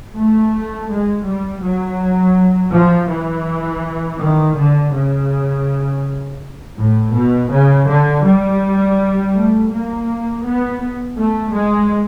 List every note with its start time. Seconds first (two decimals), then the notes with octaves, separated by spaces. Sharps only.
0.16 A3
0.90 G#3
1.26 G3
1.63 F#3
2.73 F3
3.10 E3
4.20 D#3
4.57 D3
4.93 C#3
6.77 A2
7.14 B2
7.51 C#3
7.88 D3
8.25 G3
9.35 A3
9.72 A#3
10.45 B3
11.18 A3
11.54 G#3